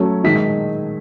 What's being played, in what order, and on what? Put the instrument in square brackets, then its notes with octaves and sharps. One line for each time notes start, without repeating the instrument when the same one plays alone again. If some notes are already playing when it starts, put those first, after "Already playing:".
Already playing: [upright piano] F#3 A3 C#4
D#3 G#3 D#4 B6
B6